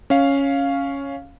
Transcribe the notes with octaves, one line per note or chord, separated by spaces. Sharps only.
C#4 F5